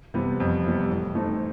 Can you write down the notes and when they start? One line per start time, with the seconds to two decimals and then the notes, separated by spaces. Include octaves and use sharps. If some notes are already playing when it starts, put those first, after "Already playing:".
0.14 C3 E3 G3 B3
0.40 F2
0.64 C3 E3 G3 B3
0.89 A2
1.14 E3 A3 C4 D#4